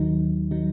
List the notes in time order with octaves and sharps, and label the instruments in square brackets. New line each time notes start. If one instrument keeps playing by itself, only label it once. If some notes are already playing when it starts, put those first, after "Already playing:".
Already playing: [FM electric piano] D#2 D#3 F#3 D#4
D#3 F#3 D#4